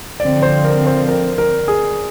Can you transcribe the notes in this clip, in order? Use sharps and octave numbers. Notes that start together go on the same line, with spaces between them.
D3 F3 C4 D5
C5
A#4
C5
A#4
A#4
G#4